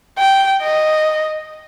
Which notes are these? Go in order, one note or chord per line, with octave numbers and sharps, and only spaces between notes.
G5
D#5